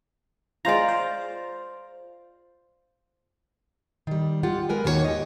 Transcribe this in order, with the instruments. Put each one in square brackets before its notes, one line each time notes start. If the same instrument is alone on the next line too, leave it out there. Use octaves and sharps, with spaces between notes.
[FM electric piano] G#3 C5 A#5 [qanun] F4 D5
[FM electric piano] C5
[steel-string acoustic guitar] D#3 G3
F4 G4 F#5
G#3 A#4 B4 G#5
D#2 D#3 A#3 F#4 G#4 C#5
G4 D#5